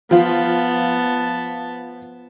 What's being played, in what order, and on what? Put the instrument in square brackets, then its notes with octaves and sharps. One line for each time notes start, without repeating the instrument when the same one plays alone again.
[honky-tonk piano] F3 F4 [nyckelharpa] B3 A5